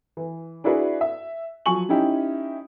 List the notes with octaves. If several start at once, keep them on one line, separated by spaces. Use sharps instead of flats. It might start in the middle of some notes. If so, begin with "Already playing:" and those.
E3
D4 E4 F#4 G#4 B4
E5
F3 F#3 G#5 C#6 F#7
C#4 D#4 E4 G4